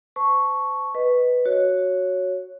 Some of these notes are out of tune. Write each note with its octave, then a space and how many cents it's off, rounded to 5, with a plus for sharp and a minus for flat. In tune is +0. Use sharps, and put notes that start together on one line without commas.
C5 -35 A5 +0 C#6 +0
B4 +0 D#5 +0
F#4 +0 C#5 +0